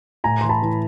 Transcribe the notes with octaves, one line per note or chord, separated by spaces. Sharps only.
A2 G#5 A#5
E3 C6
A5 B5
E3